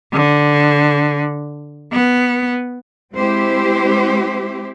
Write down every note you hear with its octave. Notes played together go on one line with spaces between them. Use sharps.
D3
B3
G#3 C4 E4 G4 C5